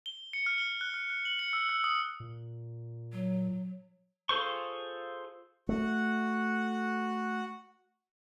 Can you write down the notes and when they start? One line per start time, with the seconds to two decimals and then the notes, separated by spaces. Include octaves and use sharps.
0.06 G7
0.33 C#7
0.46 F6
0.58 G7
0.81 F#6
0.94 F6
1.10 F#6
1.25 F#7
1.39 C#7
1.53 E6
1.69 E6
1.84 D#6
2.20 A#2
3.12 F#3
4.29 F4 G#4 A4 C5 C#6
5.69 A3 F#4 F#5